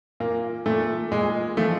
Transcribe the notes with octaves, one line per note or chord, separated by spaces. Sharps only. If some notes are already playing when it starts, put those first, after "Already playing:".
A#2 A#3
A#2 A3
A#2 G#3
F3 A3